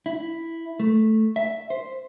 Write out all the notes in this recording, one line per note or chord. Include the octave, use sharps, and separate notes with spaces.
E4
A3
E5
C5